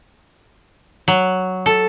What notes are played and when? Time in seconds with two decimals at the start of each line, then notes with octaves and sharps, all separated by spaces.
1.08 F#3
1.66 A4